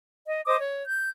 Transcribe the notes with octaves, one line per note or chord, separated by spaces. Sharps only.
D#5
C5 D#5 D6 D#6
C#5
G6